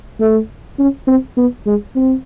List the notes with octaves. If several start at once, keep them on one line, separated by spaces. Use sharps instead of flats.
A3
C#4
C4
B3
G#3
C4